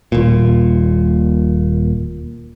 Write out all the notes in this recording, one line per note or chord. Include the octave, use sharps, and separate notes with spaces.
D#1 A#2